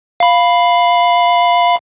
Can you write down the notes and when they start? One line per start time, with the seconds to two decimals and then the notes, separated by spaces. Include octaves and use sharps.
0.20 F5 B5